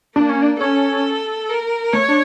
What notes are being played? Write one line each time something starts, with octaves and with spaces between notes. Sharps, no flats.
A#3 D4
C#4
D4
C#4 A4
A#4
A3 C#5
D4